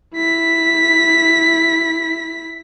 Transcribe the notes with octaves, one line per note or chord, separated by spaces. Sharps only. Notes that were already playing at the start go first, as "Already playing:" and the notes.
E4 B6